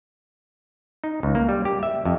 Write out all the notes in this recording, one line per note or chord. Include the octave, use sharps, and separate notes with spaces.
D#4
C#2
A#3
G3
G4
E5
F2